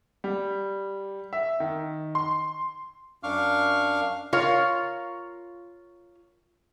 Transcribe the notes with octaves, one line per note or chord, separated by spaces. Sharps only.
G3
E5
D#3
C6
F#2 D4 F5 C#6 D6 F6
F4 A#4 C#5 F5